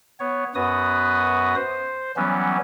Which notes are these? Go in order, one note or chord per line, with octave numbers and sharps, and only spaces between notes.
B3 C#5
F#2 B3 F#4 B4 D#6
C5
E3 F#3 G3 B3 C#4